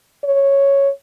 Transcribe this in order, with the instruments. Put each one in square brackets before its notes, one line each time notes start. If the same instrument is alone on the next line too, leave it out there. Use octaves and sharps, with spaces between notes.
[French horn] C#5